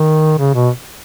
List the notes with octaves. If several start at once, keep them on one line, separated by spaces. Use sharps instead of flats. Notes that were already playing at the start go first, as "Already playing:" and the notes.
Already playing: D#3
C#3
B2